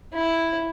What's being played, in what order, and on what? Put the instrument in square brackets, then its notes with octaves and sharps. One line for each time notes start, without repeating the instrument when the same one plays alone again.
[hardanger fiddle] E4